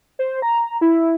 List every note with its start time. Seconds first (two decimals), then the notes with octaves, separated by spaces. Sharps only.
0.19 C5
0.42 A#5
0.81 E4